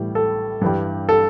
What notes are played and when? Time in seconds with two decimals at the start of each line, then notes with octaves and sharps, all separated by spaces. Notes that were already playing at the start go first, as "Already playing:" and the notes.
Already playing: A2 E3 G3
0.15 A4
0.61 G2 E3 G3
1.09 A4